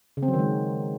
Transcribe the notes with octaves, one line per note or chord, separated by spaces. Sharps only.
C#3
C4
F#3
D#3
G#3